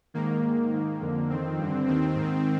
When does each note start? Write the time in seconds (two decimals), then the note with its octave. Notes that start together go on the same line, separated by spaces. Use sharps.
0.14 G#2 D#3 A#3
0.43 G#2 D#3
0.72 G#2 D#3
1.01 F2 D3
1.30 F2 D#3 C4
1.58 G2 D3
1.87 D#2 D#3 C4
2.15 G#2 D#3